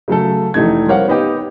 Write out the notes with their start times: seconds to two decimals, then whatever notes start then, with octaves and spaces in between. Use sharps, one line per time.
0.08 C#3 F#3 A3 A4
0.54 F1 E3 A3 D#4 G#6
0.87 G3 C4 A#4 C#5 F5 F#5
1.08 B3 D#4 G4